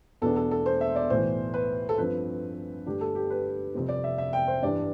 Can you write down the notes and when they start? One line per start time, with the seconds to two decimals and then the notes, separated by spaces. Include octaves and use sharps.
0.22 E2 B2 B3 D4 A4
0.36 A4
0.51 A4
0.66 C5
0.81 E5
0.96 D5
1.10 B1 A2 E3 C5
1.54 B4
1.89 A4
1.98 G2 F3 C4 B4
2.86 G2 D3 A3 D4 G4
3.01 A4
3.15 G4
3.30 B4
3.75 F1 F2 C3 G3 C4
3.89 D5
4.04 E5
4.18 E5
4.33 G5
4.48 C5
4.62 G2 E3 G3 D4 D5